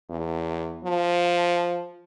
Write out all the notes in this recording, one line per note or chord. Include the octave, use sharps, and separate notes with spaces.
E2
F3